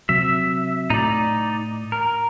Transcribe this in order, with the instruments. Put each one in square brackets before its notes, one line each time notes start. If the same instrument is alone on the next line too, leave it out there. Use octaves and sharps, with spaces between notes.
[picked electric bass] C3 F#3 [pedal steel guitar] E5
[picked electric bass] A2 [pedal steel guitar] D#4 D5
[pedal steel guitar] A#4